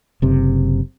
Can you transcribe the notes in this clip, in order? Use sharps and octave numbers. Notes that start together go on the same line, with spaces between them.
F#1 C3